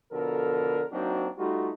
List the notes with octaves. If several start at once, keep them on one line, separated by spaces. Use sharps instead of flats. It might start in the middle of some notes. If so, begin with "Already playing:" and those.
B2 D3 F3 A4 A#4
F#3 A#3 C4 D4 D#4 F#4
G3 A3 D#4 F4 F#4